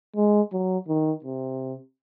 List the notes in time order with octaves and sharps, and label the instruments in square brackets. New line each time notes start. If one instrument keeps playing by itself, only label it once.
[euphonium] G#3
F#3
D#3
C3